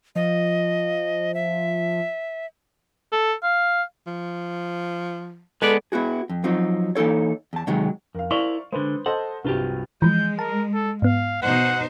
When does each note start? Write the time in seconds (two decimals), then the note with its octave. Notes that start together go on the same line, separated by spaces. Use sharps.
0.16 F3 D#5
1.34 E5
3.12 A4
3.43 F5
4.07 F3
5.62 G#3 B3 A4 B4 D5
5.92 B3 E4 F#4 G#4
6.29 F2
6.44 F3 F#3 C4 D#4
6.95 E3 A#3 D#4 A4 C#5
7.53 E2 A5
7.67 C3 D#3 F#3 G#3
8.15 F2 A#4 F5
8.31 E4 A#4 C5 D5 F5 C#6
8.72 D3 G#3 B4 C5
9.06 A4 C5 D#5 F#5
9.45 C2 G2 C3 F#3 F4 G4
10.02 E3 F3 G#3 G6
10.39 A#4 A5
10.74 A4
11.02 G#2 B3 F5
11.42 B2 D#4 C5 F#5